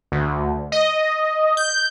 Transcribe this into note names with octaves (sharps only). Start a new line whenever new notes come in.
D2
D#5
G6